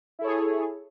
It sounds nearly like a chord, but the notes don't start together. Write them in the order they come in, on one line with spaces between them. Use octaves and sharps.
E4 A4 C#5 G#4